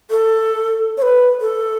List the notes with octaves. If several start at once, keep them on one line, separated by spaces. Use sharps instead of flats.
A4
C#5
B4
A4